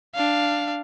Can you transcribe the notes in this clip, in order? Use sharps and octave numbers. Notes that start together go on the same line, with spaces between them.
D4 F5